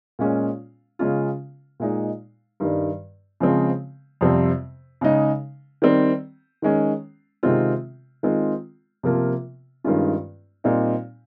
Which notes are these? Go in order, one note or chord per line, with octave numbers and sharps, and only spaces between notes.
A#2 G#3 C#4 F4
C#3 G#3 C#4 F4
A#2 G#3 D#4
G2 D#3 G3
C#3 F3 G#3 C4
F2 C3 G3 C4
C#3 G#3 D#4
D#3 G3 C4
D#3 G#3 C#4
C3 D#3 G#3 C4 F4
D#3 G#3 C4 F4
C3 F3 A#3 F4
G2 D#3 G#3 C#4 F4
A#2 G3 C4 D#4